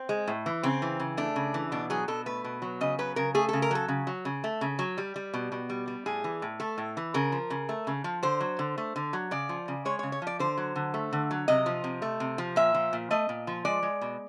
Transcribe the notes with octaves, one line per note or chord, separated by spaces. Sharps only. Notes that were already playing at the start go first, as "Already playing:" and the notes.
Already playing: C4
G#3
A2
E3
C#3 C4
E3
C#3
A3 D4
C#3
E3
B2 D4
F#3 G#4
B2 A4
A3 B4
B2
F#3
C#3 D#5
F#3 B4
C#3 A#4
A3 G#4
A4
C#3
A#4
F#3 A4
C#3
F#3
C#3
A3
C#3
F#3
G3
G3
B2
B2
G3
G3
A2 G#4
E3
A2
A3 A4
A2
E3
C#3 A#4
F3
C#3
A3
C#3
F3
D3 C5
F#3
D3
A3
D3
F#3
C#3 D5
F3
C#3
G#3 C#5
C#3 C#5
C#5
F3 D5
D3 C5
F#3
D3
A3
D3
F#3
C3 D#5
F3
C3
A3
C3
F3
A#2 E5
F3
A#2
A3 D#5
A#2
F3
G#3 D5
G#3
B2